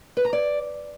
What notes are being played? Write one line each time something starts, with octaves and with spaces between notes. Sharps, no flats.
B4
A#5
D5